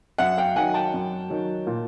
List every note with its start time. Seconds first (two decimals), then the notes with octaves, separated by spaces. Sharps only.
0.18 F#2 E5 F#5
0.38 F5 G5
0.55 D#3 F#3 F#5 G#5
0.74 G5 A5
0.93 F#2
1.30 D#3 F#3
1.67 A#2